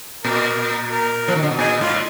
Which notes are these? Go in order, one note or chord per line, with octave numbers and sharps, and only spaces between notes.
A#2 A#4
A#4
F3
D#3
D3
B2
A#2 G#4
G#2 F4